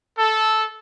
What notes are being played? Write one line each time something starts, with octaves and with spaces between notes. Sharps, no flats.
A4